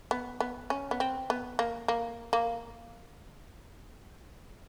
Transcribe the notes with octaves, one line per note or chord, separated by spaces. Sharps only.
B3
B3
C#4
B3
C4
B3
A#3
A#3
A#3